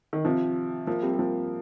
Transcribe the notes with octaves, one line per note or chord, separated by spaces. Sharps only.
D#3
C3 F3
F3 A#3
G3 C4
G3
F3 A#3